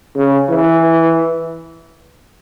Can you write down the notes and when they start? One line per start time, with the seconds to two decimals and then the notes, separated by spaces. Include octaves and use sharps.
0.16 C#3
0.50 E3